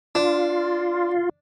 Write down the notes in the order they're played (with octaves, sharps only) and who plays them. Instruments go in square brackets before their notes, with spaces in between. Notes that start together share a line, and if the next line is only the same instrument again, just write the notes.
[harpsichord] D4 [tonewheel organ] F4